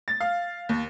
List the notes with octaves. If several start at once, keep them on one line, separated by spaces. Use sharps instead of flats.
A6
F5
D#2